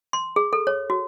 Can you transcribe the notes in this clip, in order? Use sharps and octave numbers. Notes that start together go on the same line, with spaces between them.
C6
G#4
A4
C#5
F#4